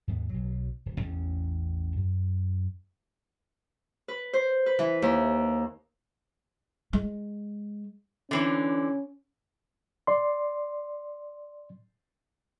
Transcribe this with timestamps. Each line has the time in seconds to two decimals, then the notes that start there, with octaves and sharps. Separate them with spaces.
0.08 D#2 G#2 A3 B3
0.30 B1 F#3
0.86 D1
0.98 A1 E2 C#4
1.96 F#2
4.08 B4
4.33 C5
4.66 B4
4.79 E3
5.02 D#2
6.93 G#3
8.31 D3 E3 C4 C#4
10.07 D5 C6